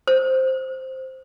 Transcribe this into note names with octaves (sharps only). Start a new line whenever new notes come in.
C5